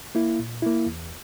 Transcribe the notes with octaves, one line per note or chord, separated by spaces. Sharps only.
A#3 E4
A#2
A#3 E4
E2